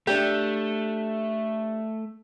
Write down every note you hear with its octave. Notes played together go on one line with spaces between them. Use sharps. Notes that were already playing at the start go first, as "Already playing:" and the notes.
A3 D4 G4